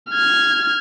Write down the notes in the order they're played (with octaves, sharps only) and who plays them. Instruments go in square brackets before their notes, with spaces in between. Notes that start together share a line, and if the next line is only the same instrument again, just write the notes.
[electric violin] F6 G#6